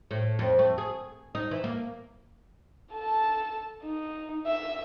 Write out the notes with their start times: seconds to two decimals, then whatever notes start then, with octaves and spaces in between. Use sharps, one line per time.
0.11 A2
0.39 F2
0.59 A3
0.78 G#4
1.35 D#4
1.51 E3
1.64 A#3
2.92 A4 A5
3.84 D#4
4.46 E5